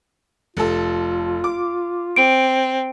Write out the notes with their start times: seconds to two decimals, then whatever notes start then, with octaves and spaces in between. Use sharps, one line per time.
0.57 F1 F4 A4
1.44 D6
2.16 C4 D7